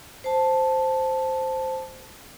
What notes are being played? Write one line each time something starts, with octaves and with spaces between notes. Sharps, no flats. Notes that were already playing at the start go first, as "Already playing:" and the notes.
C5 A5